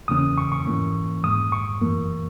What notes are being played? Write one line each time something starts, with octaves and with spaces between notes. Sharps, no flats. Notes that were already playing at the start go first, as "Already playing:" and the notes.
E2 C#3 E3 A#3 C#4 D#6
C#6
C#6
G#2 E3 A#3 C#4
G#2 D#3 G#3 D#6
C#6
F#2 E3 A#3